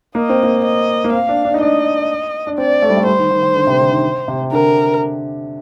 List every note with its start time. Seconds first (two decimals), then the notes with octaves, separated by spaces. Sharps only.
0.15 A#3 D#5
0.29 C4
0.43 A#3
0.64 D#5
1.04 A#3
1.12 C4 F5
1.29 D4
1.45 D4
1.54 D#4
1.61 D4 D#5
2.47 D4
2.58 C4 D5
2.82 A3
2.90 G3
2.97 A3
3.07 G3 C5
3.19 D#3
3.31 D#3
3.43 D#3
3.55 D3
3.67 C3
3.80 D3
3.91 D#3
4.28 C3
4.52 D3 A#4